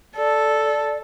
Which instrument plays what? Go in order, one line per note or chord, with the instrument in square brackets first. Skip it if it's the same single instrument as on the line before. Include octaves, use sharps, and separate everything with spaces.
[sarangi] A4 [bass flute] D5